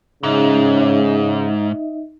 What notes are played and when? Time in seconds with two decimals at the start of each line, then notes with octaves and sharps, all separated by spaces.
0.23 G#2 C#3 D#4 D#5 E5